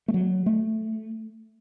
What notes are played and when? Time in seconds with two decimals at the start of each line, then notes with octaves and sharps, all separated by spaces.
0.08 A3
0.14 F#3
0.46 A3